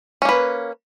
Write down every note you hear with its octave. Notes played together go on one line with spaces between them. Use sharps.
A#3 C#4 B4